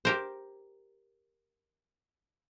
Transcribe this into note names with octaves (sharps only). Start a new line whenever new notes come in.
G4 A#4 C5